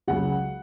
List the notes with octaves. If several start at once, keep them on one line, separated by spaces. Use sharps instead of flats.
C#2 C#3 F#3 F#5